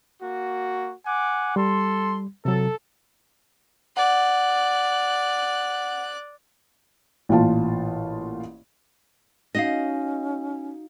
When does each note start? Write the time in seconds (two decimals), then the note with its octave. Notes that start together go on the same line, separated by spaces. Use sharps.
0.21 A#3 F#4
1.05 F#5 G#5 D6
1.56 G3 A4 C6
2.45 C3 F#3 A4
3.97 D5 F#5 F#6
7.29 A1 A#2 F4 A5
9.55 C#4 D#4 F#4 D#5 F5 A#6